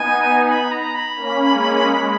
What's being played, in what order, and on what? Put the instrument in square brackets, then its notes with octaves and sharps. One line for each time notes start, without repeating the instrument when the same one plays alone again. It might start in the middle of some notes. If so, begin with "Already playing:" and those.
Already playing: [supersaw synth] B3 D#4 [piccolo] G#5
[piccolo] B5
A#5
B5
[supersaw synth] A#3 C#4
G#3
G#3